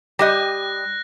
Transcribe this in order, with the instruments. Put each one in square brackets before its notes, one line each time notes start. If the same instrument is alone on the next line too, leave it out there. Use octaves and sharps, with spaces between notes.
[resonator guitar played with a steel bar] G3 G4 D#5 [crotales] F#6 A#6